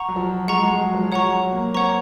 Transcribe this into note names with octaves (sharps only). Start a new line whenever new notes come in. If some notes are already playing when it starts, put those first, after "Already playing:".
Already playing: F#5 A#5 C#6
F#3
F3
G#3 F#5 A#5 C#6
G#3
F#3
F3
F#3 C#5 F#5 A#5 C#6
F#3
A#3
C4 C#5 F#5 A#5 C#6